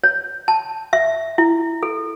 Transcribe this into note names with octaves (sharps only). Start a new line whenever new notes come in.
C#5
A5
E5
E4
A4